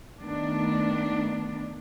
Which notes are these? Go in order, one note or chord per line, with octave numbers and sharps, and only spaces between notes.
D#3 A3 B3 D4